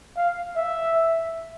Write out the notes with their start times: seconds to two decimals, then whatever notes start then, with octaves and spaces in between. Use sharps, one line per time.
0.16 F5
0.56 E5